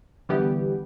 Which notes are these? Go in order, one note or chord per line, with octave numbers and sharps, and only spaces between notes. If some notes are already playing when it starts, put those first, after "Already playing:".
D3 E3 G3 B3 G4